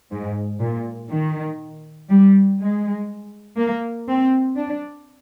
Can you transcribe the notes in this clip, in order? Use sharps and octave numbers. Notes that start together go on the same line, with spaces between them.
G#2
A#2
D#3
G3
G#3
A#3
C4
D4